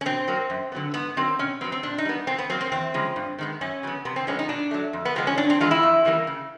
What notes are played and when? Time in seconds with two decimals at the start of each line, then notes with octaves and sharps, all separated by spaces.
0.01 C#4
0.05 B2 C4
0.28 F#3 A#3
0.50 F#2
0.72 D3 F#3 B3
0.94 G#2 B3
1.16 D#3 F#3 A#3 C4
1.39 B2 C#4
1.61 F#3 B3 C4
1.72 C4
1.83 A#2 D4
1.98 D#4
2.05 G3 B3
2.27 B2 C4
2.38 B3
2.50 F#3 A#3 C4
2.61 C4
2.72 E2 C4
2.94 C#3 F3 G#3
3.16 G2
3.39 D#3 G#3 B3
3.61 F#2 C#4
3.83 C#3 F#3 B3
4.05 C3 B3
4.16 C4
4.27 F3 G#3 B3 C#4
4.39 D#4
4.49 B2 D4
4.71 F#3 A3
4.93 F2
5.05 B3
5.15 C3 F3 G#3 C4
5.27 C#4
5.38 G2 D4
5.50 C4
5.60 E3 G#3 B3 F4
5.71 E4
5.83 F2
6.05 C#3 E3 G3 A#3
6.27 C#3